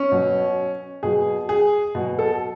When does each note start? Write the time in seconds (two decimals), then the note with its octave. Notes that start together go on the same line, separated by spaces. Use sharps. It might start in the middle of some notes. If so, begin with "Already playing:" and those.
Already playing: C#4
0.12 B2 F#3
1.03 B2 F#3 G#4
1.49 G#4
1.95 B2 F#3
2.19 A4